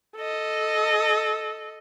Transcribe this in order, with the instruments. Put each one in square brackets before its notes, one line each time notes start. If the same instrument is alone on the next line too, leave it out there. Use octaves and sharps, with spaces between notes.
[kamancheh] A4 D#5